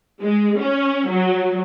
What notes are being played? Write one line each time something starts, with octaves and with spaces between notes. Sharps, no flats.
G#3
C#4
F#3